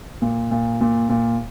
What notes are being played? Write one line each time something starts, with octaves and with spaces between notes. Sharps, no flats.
A#2
A#2
A#2
A#2